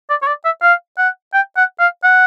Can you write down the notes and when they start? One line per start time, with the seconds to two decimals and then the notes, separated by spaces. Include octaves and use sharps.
0.10 D5
0.22 C#5
0.27 D5
0.45 E5
0.62 F5
0.98 F#5
1.34 G5
1.57 F#5
1.80 F5
2.04 F#5